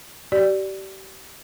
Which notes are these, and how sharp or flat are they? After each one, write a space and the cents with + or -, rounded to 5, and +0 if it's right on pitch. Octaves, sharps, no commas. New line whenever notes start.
G4 -35 D5 -5